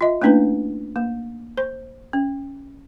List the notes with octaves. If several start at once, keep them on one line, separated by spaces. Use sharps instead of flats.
F4 D#5 E5
A3 A#3 C#4 D4 E4 B4
A#3
C5
C#4